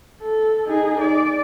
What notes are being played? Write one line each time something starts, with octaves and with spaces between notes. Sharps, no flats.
A4
D#4 G#4
D5